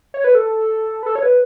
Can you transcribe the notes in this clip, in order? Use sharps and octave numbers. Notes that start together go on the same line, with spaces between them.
C#5
B4
A4
B4
A4
C#5
B4